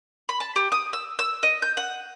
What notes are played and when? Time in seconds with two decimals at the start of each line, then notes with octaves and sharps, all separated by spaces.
0.29 B5
0.40 A5
0.56 G4
0.72 D#6
0.93 E6
1.19 E6
1.43 D#5
1.62 G6
1.77 F#5